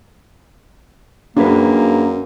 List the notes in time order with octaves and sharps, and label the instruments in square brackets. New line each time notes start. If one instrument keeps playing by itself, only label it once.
[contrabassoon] F#2 [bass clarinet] A#3 [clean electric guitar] D4 G#4 B4